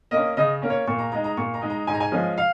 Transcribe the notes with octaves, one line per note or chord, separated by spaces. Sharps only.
A#3 D#5
C#4
C#3 D#5
A#3 C#4
C#5
A#2 C#6
A#5
G#3 D#4 A#5
A#5
A#2 C#6
A#5
G#3 D#4
A#5
G#2 G#5
A#5
G#5
F3 G#3 C#4
F5